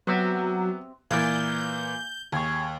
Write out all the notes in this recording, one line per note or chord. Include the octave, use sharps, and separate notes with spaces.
F#3 B3 C4 G4 E5
A#2 E3 A#3 E4 F4 D5 G6
D#2 G#4 C#5